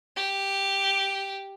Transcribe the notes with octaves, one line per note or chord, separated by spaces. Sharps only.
G4